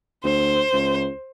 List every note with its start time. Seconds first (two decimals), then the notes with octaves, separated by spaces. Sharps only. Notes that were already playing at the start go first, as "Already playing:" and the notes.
0.24 D2 C5
0.73 C#2